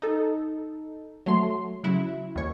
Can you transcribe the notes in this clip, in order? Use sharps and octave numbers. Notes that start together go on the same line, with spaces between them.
D#4 A4
F#3 A3 C6
C#3 F#3 E4
D#2 C#5